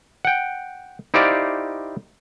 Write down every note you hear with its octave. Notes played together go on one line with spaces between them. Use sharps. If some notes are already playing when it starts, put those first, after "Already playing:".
F#5 G5
D#4 E4 G4 C5 D5 F5